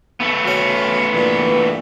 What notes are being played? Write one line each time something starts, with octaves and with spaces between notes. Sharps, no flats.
A3 B3
C#4 F#4
G2 A#2 E3